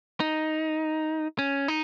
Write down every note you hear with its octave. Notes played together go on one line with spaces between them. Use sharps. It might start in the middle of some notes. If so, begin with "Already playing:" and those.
D#4
C#4
D#4